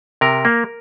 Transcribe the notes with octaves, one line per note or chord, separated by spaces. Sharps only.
C3 A#4
A#3